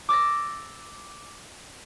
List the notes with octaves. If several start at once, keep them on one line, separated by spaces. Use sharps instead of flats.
D6 E6 A6 A#6